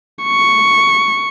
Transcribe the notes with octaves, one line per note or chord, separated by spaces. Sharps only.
C#6